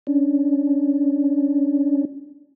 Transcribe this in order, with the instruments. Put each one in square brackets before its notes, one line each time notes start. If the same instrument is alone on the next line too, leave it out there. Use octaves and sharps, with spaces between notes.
[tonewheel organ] C#4 D4